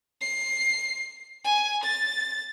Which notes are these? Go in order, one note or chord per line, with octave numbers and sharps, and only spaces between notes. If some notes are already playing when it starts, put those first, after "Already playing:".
C7
G#5
A6